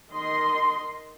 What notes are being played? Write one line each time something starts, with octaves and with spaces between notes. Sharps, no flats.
D#3 D#5 C6